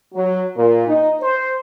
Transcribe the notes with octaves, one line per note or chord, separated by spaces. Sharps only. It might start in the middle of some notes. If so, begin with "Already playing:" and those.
F#3
A#2
D#4
C5